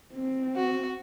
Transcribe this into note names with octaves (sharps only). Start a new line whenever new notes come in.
C4
F#4